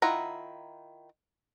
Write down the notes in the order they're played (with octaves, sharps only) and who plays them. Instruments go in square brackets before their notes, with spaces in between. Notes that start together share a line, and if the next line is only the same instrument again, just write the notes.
[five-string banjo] D#3 E4 F4 F#5 A#5